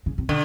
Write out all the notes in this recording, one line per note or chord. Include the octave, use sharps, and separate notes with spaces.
C#3
C3
B2 D3